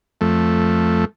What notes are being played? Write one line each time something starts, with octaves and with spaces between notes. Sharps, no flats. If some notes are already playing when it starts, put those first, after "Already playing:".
F2 A3